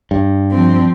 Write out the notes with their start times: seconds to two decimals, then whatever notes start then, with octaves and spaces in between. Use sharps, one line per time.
0.11 G2
0.51 F3 C4